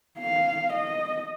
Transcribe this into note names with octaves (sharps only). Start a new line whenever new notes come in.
F5
D#5